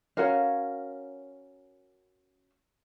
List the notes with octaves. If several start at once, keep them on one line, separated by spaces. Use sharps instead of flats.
C#4 F#4 A#4 F5